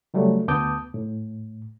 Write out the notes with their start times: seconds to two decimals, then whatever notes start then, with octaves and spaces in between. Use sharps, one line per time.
0.14 C#3 F#3 G3 A3
0.48 D2 B3 A5 D6 D#6 G6
0.94 A2